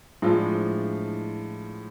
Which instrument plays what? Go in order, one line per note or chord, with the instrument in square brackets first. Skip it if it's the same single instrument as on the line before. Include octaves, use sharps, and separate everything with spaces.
[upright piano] A2 F3 G#3 D4 F4